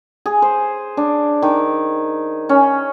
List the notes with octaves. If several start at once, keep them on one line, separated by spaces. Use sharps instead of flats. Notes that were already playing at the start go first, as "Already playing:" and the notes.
G#4
C5
D4
D#3
C#4